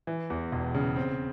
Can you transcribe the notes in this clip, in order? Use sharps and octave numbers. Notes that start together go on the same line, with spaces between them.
E3
E2
E1
C#3
C4